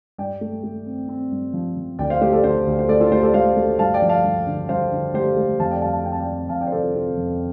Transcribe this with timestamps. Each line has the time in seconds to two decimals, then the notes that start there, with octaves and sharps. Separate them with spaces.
0.18 G2 D5 G5
0.41 A3
0.64 A3
0.86 C4
1.09 C4
1.31 G2
1.53 F3
1.77 F3
1.99 D2 D5 G5
2.10 C5 F5
2.21 A3 G4 C5
2.33 A4 D5
2.44 D3 G4 C5
2.66 D2
2.79 C5
2.89 A3 A4 D5
3.00 F4 A4
3.12 A3 G4 C5
3.23 A4 D5
3.34 A3 C5 F5
3.56 A3
3.79 G2 F5 A5
3.94 D5 G5
4.02 F3
4.09 F5 A5
4.24 G2
4.47 D3
4.69 G2 C5 F5
4.92 D3
5.14 A3 G4 C5
5.37 A3
5.59 F2 F5 A5
5.71 D5 G5
5.82 G3 F5 A5
5.93 F5 A5
6.04 C4 G5
6.12 A5
6.20 D5 G5
6.27 C4
6.49 F2 F5 A5
6.61 D5 G5
6.67 C5
6.72 C3 A4 D5
6.83 F4 A4
6.94 C3 F4 A4
7.17 F2